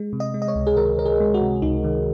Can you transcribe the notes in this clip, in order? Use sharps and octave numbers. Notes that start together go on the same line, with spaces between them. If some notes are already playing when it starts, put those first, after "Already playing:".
Already playing: G#3
C3
D#5
G#3
D#5
C#5
C#2
G#4
D#3 A#4
C#2 A#4
G#4
G#3
F#4
C3
C#2 D#4
D#3